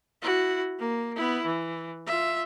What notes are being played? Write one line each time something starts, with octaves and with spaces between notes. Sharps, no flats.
E4 F#4
A#3
B3 E4
E3
F4 E5